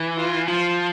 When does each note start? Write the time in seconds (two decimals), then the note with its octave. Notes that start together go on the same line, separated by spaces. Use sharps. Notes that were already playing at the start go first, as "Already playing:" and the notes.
Already playing: E3
0.18 F4
0.48 F3 F4